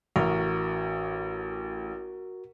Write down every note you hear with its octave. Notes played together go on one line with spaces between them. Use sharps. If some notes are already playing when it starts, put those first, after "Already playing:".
A1 F#4 A#4